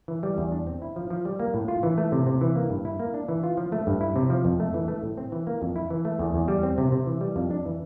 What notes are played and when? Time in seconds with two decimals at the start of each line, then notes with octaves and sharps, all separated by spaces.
0.08 E3
0.23 G3
0.38 E2
0.52 D4
0.67 C4
0.82 E4
0.96 F3
1.10 F3
1.25 G3
1.40 A#3
1.54 A2
1.68 F4
1.83 E3
1.98 A3
2.12 C3
2.27 C3
2.41 E3
2.55 A#3
2.70 G2
2.85 E4
2.99 A#3
3.14 D4
3.29 E3
3.43 F4
3.57 F3
3.72 A3
3.87 G2
4.01 E4
4.16 C3
4.30 F3
4.45 F2
4.60 A3
4.74 E3
4.88 A3
5.03 A2
5.17 C4
5.32 E3
5.47 A#3
5.62 F2
5.76 E4
5.90 E3
6.05 A3
6.19 E2
6.34 E2
6.48 G3
6.63 C4
6.78 C3
6.92 C3
7.06 E3
7.21 G3
7.36 F2
7.51 D4
7.65 E3